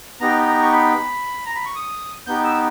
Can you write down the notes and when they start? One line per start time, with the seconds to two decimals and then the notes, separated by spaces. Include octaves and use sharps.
0.20 B3 D#4 G4 A#5
0.47 A#5
0.62 C#6
0.72 B5
1.46 A#5
1.55 B5
1.66 C#6
1.76 D#6
2.27 B3 D#4 G4 G6
2.44 E6